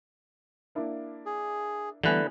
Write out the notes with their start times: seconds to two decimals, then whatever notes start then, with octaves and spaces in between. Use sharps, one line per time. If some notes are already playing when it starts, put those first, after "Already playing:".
0.75 A#3 D4 E4
1.26 G#4
2.03 D3 E3 G3 A3 B3 E4 B4 G#5